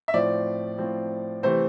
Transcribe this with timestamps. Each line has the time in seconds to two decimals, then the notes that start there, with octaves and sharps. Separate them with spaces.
0.08 E5
0.14 A2 F3 C4 D5
0.78 A2 F3 C4
1.43 C3 E3 A3 C4 C5